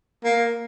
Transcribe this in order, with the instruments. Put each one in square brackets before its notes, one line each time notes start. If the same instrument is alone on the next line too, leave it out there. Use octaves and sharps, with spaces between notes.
[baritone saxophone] A#3